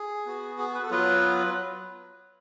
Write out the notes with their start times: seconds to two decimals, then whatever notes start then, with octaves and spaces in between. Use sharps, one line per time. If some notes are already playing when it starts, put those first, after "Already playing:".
Already playing: G#4
0.26 B3 F#4
0.59 G#4
0.75 B4
0.83 A4
0.90 F#3 B3 F4 B4